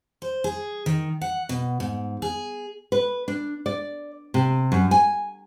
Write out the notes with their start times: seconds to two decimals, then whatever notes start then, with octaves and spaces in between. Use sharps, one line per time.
0.22 C5
0.44 G#4
0.86 D#3
1.21 F#5
1.49 B2
1.80 G#2
2.22 G#4
2.92 B4
3.28 D4
3.66 D5
4.34 C3
4.72 F#2
4.91 G#5